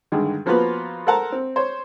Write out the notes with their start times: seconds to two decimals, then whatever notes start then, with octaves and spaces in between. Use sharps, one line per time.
0.12 G2 D3 D#3 G#3
0.46 F3 A#3 B3 F4 F#4 B4
1.06 A4 A#4 C5 F#5 A5 A#5
1.32 C4
1.56 C5 C#5